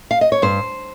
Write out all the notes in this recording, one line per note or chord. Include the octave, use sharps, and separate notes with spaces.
F5
D#5
C#5
G2 C5